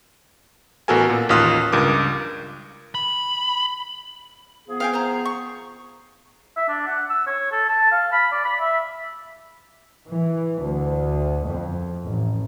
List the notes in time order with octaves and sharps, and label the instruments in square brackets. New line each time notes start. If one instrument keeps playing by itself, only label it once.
[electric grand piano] A1 B3 F#4 A4 A#4 G#5
A#2
A1 D#2 F4 D#6 F6 F#6
C#2 G2 A#4 D6
[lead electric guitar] B5
[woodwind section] F3 B3 G#4
[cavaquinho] F5 G5 G#5
C5 A#5
C#6
[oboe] E5
D4
F#5
E6
C#5
A4
A5
F5
B5
D5
B5
E5
[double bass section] E3
D2
F2
A1